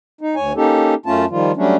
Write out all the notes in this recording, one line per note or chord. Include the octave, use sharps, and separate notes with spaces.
D#4
D2 C#5 G#5
A#3 C#4 D#4 G4 A4
F#2 A3 C#4 F4 A5
D#3 F3 G3 F4
F#3 G3 A3 C#4 D4